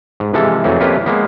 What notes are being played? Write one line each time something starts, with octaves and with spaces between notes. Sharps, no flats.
G#2
C3 E3 F3 G#3 A4
F2 E3 F#3 A3
F2 A#3 C#4 F4 G4 B4
G#3 A#3 B3